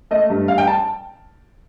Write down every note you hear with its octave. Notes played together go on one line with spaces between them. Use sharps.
A3 D#5
G2
G2 F5
G5
A5